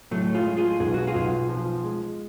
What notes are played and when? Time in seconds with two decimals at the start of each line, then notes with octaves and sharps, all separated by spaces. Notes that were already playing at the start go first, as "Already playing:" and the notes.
0.11 A2 F#3 A3
0.34 F4 G#4
0.45 G#3
0.57 F4 G#4
0.80 B1 G#4
0.94 F#4
1.07 F4 G#4
1.15 B1
1.49 F3
1.84 G#3